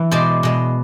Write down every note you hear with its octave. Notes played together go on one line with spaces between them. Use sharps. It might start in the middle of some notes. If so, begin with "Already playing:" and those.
Already playing: E3
B2 G#3 C5 D5
B2 G#3